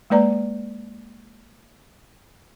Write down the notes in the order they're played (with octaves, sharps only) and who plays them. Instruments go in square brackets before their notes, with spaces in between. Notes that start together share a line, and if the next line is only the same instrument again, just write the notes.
[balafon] G#3 A#3 B4 D5 A#5